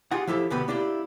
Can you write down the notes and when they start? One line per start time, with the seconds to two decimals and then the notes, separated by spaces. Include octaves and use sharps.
0.11 F4 G4 G#4 F#5
0.27 F3 E4 G4 A4
0.50 D2 B2 B3 G4 B5
0.68 A#3 D4 E4 G4 D5